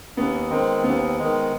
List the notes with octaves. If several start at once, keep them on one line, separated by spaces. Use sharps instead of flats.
D#2 B3
D#3 G#3 C4
D#2 B3
D#3 G#3